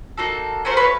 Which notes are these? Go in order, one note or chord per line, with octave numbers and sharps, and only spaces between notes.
A#3 D#4 F#4 A4
A3 C#4 F#4 A#4 C5
B4 C#5